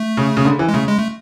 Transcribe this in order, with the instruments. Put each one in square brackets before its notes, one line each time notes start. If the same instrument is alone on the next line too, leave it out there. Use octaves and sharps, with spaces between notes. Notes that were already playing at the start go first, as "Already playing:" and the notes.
Already playing: [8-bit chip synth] A3
[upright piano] C#3
C#3
D3
E3
[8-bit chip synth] G#3
[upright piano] C#3 [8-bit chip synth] A3
[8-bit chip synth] G#3
A3